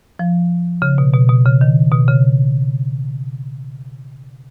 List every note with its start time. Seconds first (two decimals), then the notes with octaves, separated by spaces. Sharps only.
0.19 F3
0.82 C#3
0.98 B2
1.13 B2
1.29 B2
1.45 C#3
1.61 D#3
1.92 B2
2.08 C#3